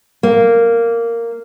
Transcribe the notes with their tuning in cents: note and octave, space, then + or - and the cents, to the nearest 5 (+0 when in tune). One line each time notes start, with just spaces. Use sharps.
A#3 -10